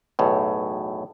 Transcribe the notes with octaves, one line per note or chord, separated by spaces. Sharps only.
B1 E2 A2